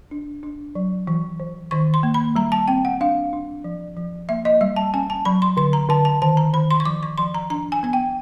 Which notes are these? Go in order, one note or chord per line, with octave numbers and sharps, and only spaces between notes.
D4
D4
F#3
E3
E3
D#3 C#6
C6
A#3
B5
G3 A#5
A5
C4 G5
F#5
D4 F5
D4
F3
F3
A#3 E5
D#5
G3 E5
A5
C#4 G#5
A5
F#3 B5
C6
D3 C6
A#5
D3 A5
A5
D#3 A5
A#5
D#3 B5
C6
C#6
F3 D6
C#6
F3 C6
A#5
D4 A#5
G#5
B3 G#5
G5